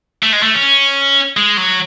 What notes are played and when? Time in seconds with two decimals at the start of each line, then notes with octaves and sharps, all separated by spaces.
0.23 A3
0.33 G#3
0.43 A3
0.54 C#4
1.37 G#3
1.57 F#3